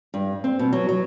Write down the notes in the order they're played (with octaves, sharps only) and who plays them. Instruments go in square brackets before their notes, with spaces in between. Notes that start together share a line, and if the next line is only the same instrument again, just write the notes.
[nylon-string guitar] G2
C4
B2
F#3
F#3